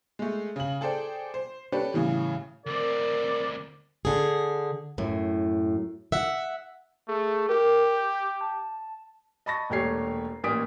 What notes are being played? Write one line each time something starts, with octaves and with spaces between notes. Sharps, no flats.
G#3 A3
C#3 F#7
G#4 A4 C5 D5 G5
C5
C#4 D4 G4 A4 B4
A2 C#3 E3 G3
D2 C4 A#4 D5
D3 G#4
F#2 A2
E5 F#5
A3 G#4
G4 A#4
G6
A5
D#5 A5 B5 C#6 A6 A#6
E1 A#2 A3 G4 C#5 C7
A1 A#2 A#3 D#6 B6 D7